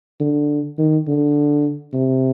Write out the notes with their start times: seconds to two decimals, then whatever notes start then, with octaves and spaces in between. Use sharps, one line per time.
0.21 D3
0.78 D#3
1.08 D3
1.93 C3